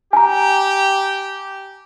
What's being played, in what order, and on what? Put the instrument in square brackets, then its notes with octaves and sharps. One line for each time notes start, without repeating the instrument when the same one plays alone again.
[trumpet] G4 [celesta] G#5 A#5